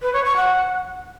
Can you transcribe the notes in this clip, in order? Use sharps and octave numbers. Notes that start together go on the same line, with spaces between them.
B4
C#5
C#6
F#5